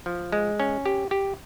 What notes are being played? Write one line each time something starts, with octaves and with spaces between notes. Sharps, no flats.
F3
G#3
C#4
G4
G4